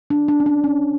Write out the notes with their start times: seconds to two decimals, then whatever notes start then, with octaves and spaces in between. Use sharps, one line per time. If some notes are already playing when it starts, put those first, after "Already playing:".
0.10 D4
0.28 D4
0.40 C#4
0.46 D4
0.64 C#4